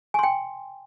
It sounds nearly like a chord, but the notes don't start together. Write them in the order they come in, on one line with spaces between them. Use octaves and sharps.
G#5 C6 G5